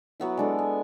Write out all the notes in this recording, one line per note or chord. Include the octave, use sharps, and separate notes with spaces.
F#3 B3 E4
G#3 D4 A4
G#5